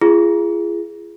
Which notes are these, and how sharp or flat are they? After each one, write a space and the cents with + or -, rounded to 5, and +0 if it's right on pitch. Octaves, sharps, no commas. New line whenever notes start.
F4 -40 G#4 +0